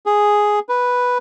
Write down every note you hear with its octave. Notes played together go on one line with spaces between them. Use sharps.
G#4
B4